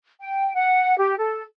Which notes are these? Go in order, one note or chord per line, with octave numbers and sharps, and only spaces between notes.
G5
F#5
G4
A4